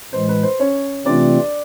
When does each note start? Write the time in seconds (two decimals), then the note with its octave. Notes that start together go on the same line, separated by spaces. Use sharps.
0.12 A2 E3 G#3 C5
0.29 B4
0.43 C5
0.60 C#4 C#5
1.05 C3 E3 A3 C4 D4 F4 D5